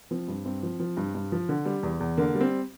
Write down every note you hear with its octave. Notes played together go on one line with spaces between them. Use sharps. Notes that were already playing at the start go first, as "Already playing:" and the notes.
F3 C4
G2
G2 C4
F3
F3
G2
G2
F3
D3
G3
E2
E2
D3 A#3
G3
C4